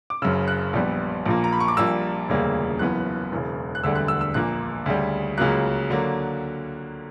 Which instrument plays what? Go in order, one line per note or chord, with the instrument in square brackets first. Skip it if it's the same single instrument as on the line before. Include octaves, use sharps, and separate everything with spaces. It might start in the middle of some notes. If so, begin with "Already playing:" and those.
[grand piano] D6
F#1 F#2 C#3 E6
F#6
A#1 A#2 G3 B3
A#1 A#2 A#3
A#5
B5
C#6
D6
A#1 A#2 G3 A#3 E6
E1 D2 C#3 G3 A#3
F#1 F#2 E3 B3 F#6
E1 E2 C#3
F#6
E1 D2 D3 G3 E6
F#6
E6
E6
A#1 A#2 A#3 F#6
D2 C#3 G3
C#2 C#3 F#3 A#3 F#6
D3 F#3 A#3